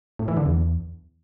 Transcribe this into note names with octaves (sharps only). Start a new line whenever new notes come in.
A2
E3
D3
E2